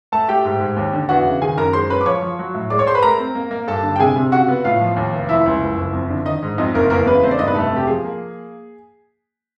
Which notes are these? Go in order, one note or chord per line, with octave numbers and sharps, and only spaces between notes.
A3 A4 A5
A3 G4 G5
G#2
G#2
D#2
D3
E2 F#4 F#5
C#3
D#3 G#4 G#5
F#2 A#4 A#5
G#3 C5 C6
C#4 B4 B5
D6
F3 C#5 C#6
F3
F#3
A2
G#3 D5 D6
C#5 C#6
G#3 C5 C6
B4 B5
A3 A#4 A#5
C4
A#3
A#3
G2 A4 A5
D3
G5
C3 G#4 G#5
C3
C#3 F#4 F#5
B3
A2 F4 F5
F3
D#2
F1
F3 E4 E5
C#2
F#1
F#1
F2
D3
D#3 D#4 D#5
G#2
F2 D#4 D#5
F#1 A#3 A#4
E2 A#3 A#4
C#3 B3 B4
A3 C4 C5
D4 D5
G2 D#4 D#5
B3 B4
F1 A3 A4
C3 G4
F3 G#4
A#3